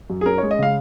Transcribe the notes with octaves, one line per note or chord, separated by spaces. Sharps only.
F#2
G#4
C#4 A#4
G#3 C#5
D#5
C#3 F5